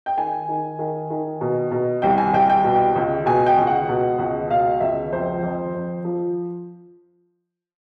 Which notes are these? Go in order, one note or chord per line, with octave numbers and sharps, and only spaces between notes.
G5
D#3 G#5
D#3
D#3
D#3
B2
B2
C2 G5
G#5
C2 G5
G5
B2
C#2
B2 G#5
G5
C#2
F#5
B2
C#2
B2 F5
C#2 E5
F2 C5
F2
F2
F3